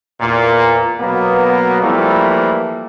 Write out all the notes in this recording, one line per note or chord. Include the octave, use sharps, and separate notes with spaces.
E2 A#2
B2 F#3 A#3 B3
E3 F3 G3 A3 A#3 E4